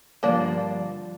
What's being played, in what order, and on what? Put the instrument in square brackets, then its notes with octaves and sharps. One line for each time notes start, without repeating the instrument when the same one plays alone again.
[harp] G2 D3 F3 [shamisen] A#3 D4